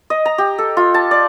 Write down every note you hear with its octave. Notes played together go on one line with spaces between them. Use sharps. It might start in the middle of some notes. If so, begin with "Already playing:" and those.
D#5
A#5
G4
A4
F4
A5
D5